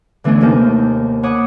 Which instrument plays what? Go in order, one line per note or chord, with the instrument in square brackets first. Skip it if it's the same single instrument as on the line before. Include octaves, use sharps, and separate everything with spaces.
[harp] D3 E3 A3 B3 C#4 D4
D#2 C3 A#3 D#4 A5 G6
C#5 F#5 B5 D6 D#6